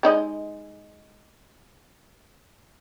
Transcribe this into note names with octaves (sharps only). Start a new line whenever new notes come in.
G#3 D#4 D#5